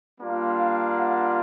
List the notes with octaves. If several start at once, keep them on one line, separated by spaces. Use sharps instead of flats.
G3 A#3 D4 F4
F5
F#5